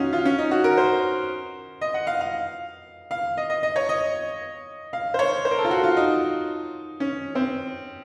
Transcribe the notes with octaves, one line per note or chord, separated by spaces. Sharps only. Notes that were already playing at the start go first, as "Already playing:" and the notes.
Already playing: C#4 D#4 F4 F#4
F4
C#4
D#4
F#4
A#4
C5
D#5
F#5
F5
F5
F5
D#5
D#5
D#5
C#5
D#5
F5
C5
C#5
C5
A#4
A4
F4
F#4
F4
D#4
C#4
C4